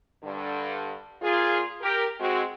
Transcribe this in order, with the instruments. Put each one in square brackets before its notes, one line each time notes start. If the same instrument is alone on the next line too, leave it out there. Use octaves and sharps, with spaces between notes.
[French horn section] G2 D3
A#2 F4 G#4
G4 A#4
G#3 C4 F#4